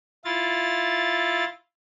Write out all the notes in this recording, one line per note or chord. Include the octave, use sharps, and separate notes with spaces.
E4 F4 A6